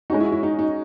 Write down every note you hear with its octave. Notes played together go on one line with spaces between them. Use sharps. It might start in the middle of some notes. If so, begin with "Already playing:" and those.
G#3 C#4 D#4 F#4
E4
E4
D#4
D#4